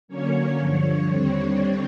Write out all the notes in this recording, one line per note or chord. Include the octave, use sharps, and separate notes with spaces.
D3 F#3 A#3 C#4 C#5
G2 D3 F3 C#5
D#2 D3 G3 C4